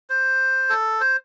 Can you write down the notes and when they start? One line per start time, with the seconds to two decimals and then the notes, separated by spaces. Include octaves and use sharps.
0.10 C5
0.70 A4
1.01 C5